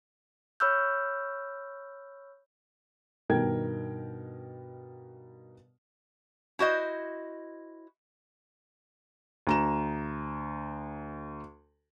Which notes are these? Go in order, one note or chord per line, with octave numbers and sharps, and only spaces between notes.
C#5 B5 C#6 E6 F6 G6
G2 B2 D#3 A#4 G5 G#6
E4 F#4 C5 D#5
D2 A#5 E7